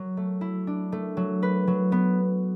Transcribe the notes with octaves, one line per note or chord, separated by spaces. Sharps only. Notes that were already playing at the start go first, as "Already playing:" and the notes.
Already playing: F#3
A3
E4
D4
A3
F#3
B4
F#3
B3